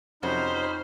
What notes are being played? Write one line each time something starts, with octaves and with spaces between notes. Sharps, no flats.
F2 C3 C#4 D#4 F#4 C5 B5 F6